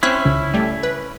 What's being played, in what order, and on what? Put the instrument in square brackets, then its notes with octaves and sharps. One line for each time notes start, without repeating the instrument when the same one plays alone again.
[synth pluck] C4 F#6 B6 [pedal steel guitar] C#4 E4
[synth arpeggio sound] C#2
[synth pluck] G3 A3
B4